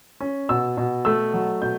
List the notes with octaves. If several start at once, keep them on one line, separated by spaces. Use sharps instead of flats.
C#4
B2 E6
B2
A3 E6
F#3
B2 G6